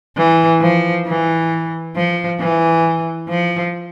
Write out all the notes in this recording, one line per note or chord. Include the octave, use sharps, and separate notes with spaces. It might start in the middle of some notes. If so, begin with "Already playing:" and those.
E3
F3
E3
F3
E3
F3